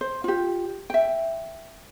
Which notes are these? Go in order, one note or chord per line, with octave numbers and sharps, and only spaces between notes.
C5
F4 G4
E5 G5